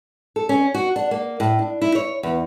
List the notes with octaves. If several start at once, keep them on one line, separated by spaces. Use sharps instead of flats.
A4
C#4
F#4
D4
A#3
A2
D4
E4
C#5
E2